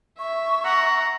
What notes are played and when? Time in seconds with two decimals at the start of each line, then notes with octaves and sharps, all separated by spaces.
0.19 E5 C#6
0.65 F#5 A#5